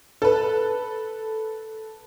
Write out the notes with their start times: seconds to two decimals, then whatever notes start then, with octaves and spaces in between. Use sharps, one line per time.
0.22 A4 B4